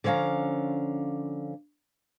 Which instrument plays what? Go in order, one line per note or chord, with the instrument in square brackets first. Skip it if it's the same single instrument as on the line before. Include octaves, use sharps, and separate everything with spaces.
[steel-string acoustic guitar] D3 F3 C#4 F5 A#5